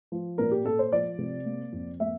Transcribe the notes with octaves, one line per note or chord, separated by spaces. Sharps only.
F3
A#2 A#4
G4
A#2 A4
C5
F3 D5
C3
A#3
F2
A#3 E5